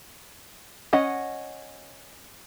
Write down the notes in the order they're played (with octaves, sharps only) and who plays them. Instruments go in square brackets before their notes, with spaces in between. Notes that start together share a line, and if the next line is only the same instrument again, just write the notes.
[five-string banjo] C#4 D#5 F#5